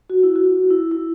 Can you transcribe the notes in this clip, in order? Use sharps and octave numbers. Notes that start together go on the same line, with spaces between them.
F#4
E4
F#4
E4
E4